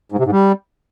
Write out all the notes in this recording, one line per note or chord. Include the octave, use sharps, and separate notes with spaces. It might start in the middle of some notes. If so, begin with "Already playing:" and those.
G#2
C3
G#2
G3